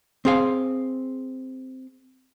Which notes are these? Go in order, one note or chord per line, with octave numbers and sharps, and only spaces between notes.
C4 G#4 F5